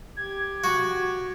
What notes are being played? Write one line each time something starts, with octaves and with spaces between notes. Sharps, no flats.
G4 G#6
F#4